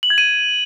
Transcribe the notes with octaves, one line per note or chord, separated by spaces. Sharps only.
F#7
G#6
D#7